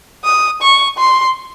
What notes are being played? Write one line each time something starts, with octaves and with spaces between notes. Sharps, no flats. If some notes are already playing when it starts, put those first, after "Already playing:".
D#6
C#6
C6